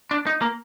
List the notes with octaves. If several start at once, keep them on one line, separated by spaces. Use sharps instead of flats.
D4
D#4
A#3